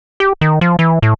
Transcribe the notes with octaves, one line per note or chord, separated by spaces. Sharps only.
G4
D#3
F3
E3
A2